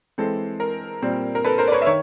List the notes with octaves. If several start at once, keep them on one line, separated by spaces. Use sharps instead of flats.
E3 G#3 C4 A4
A#4
A#2 G3 C4
A#4
A4 B4
A#4 C5
D5
B4 C#5
E5
D#3 C#5